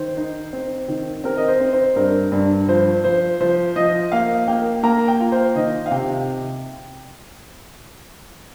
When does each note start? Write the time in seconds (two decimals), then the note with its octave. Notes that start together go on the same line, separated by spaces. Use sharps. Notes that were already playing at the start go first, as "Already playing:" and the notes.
Already playing: D#3 C5
0.17 D#4
0.53 C4
0.88 D#3
1.24 C4 A#4
1.37 D#5
1.48 C5
1.60 C4
1.73 C5
1.96 G2 A#4
2.32 G2
2.68 F3 C5
3.04 F3 C5
3.40 F3 C5
3.76 F3 D#5
4.12 A#3 F5
4.48 A#3 G5
4.83 A#3 A#5
5.08 G5
5.20 F4
5.32 C5
5.56 D#3 D#5
5.86 F5
5.91 C3 G5